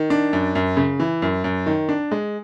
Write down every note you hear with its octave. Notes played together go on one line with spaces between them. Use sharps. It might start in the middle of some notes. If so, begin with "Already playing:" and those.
Already playing: D#3
D4
F#2
F#2
C#3
E3
F#2
F#2
D#3
D4
G#3